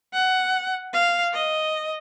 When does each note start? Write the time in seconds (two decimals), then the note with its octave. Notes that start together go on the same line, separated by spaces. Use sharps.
0.13 F#5
0.93 F5
1.33 D#5